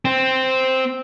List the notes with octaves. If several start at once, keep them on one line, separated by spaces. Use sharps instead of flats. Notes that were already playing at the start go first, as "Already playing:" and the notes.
C4